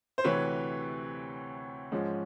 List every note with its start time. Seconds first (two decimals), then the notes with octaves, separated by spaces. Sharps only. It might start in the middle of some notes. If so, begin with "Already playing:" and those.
0.18 C5
0.24 D2 C3 E3 B4 C#5
1.92 G#2 F3 G#3 C#4